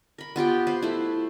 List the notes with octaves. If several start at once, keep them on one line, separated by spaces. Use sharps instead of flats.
A#4 B5
B3 F4 G4 G5
B4 C5 F5
A3 E4